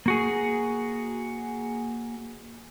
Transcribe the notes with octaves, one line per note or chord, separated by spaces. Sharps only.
A#3 F#4 G#4